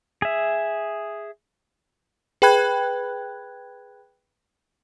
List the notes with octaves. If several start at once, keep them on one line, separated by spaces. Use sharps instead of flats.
G#4 E5
G#4 B4 G5 B5 F#6 G#6